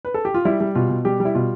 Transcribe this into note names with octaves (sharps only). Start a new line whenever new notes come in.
B4
A4
G4
F4
G3 E4
G3
B2 F4
B2
G3 G4
G3
E4
B2 F4